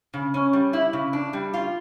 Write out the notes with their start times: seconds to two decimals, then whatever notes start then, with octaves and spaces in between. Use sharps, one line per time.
0.14 C#3
0.34 C#4
0.53 G3
0.73 E4
0.93 C#3
1.13 D4
1.33 G3
1.54 F4